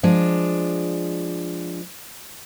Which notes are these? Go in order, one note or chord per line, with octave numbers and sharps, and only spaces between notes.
F3 G#3 D4